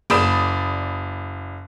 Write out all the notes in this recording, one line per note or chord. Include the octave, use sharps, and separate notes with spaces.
F#1 D5 B5 D#6 E7